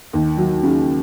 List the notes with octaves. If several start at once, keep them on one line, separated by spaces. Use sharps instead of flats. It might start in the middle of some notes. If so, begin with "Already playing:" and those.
D#2
F#3
C#3